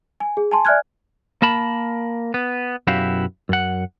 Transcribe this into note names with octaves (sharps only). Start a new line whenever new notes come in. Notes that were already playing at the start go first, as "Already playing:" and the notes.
G#5
G#4
G#5 A5 C6
D5 E5 G#5 F6 F#6 G#6
A#3 A#4 A5 B5
B3
B1 F#2 E4 F#4 G4 F5
F#2 F#5